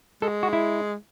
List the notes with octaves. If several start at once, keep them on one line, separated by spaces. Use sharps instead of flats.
G#3 A4
F#4
E4